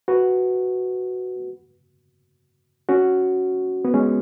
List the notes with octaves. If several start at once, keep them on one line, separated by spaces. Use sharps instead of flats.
F#4 B4
C#4 F#4
B3
G#3 C#4